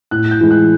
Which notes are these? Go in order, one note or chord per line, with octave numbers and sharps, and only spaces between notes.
A2 F#6
G6
E3 G#3
F#6